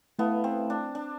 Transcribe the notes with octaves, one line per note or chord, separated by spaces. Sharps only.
A3 B3 E4 B4 F5 A5
C4
D4
D4